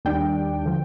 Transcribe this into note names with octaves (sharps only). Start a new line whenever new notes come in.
D#2 D#3 G3 D4 G5
D3 F3